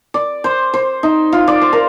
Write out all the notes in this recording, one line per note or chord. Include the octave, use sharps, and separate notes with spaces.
D5
C5
C5
D#4
F4
D5
C5
A#4